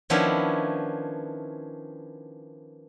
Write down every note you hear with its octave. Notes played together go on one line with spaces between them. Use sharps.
D#3 F3 B3 C#4 D4 E4